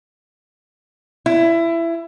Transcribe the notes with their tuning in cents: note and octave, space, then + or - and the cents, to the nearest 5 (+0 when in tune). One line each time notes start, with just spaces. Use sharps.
E4 +20